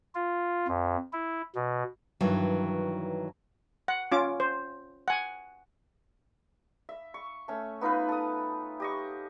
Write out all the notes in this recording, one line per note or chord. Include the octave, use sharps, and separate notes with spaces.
F4
F2
E4
B2
G2 D#3 E3 F#3
F#5
C#4 F4 D6
C5
F#5 G#5
E5
C#6
A3 C#4
B3 D#4 F4 B4
A4 D#6
G4 D#5 C#6